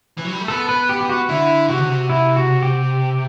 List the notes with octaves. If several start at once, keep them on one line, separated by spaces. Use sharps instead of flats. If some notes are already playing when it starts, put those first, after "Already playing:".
E3
F#3
G3
A3
B3 A4
B4
G4
G4
F#4
D3 E4
C3 F#4
D3
C3
E4
F#4
G4